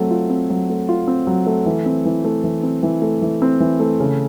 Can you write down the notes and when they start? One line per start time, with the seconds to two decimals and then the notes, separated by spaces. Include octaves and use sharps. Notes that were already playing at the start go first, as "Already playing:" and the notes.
Already playing: F#3 A3 C4
0.10 F4
0.30 C4
0.50 F#3
0.70 A3
0.89 F4
1.07 C4
1.27 F#3
1.46 A3
1.66 E3
1.86 C4
2.05 E3
2.24 A3
2.44 E3
2.63 C4
2.83 E3
3.02 A3
3.22 E3
3.42 C4
3.60 E3
3.80 A3
4.00 C#3